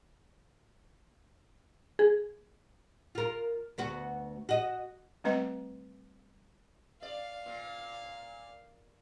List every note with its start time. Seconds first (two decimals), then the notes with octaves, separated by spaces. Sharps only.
1.99 G#4
3.15 F4 A#4
3.78 D2 B3 F#4
4.49 F#4 D#5
5.24 G3 A3 C4 B4 D#5
7.02 D5 F5
7.46 A#2